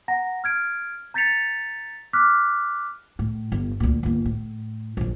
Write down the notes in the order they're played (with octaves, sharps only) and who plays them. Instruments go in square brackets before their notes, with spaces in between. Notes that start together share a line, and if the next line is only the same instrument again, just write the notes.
[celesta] F#5 A#5 A#6
F6 G#6 D7
A#5 G6 A6 B6 C#7 F7
D6 F6 F#6 B6
[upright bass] A2
G1
D2 A#2
G1 A#3
A2
A#1 F#2